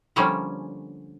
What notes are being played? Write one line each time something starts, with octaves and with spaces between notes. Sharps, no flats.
D3 F3 G3 A3 A#3 C#4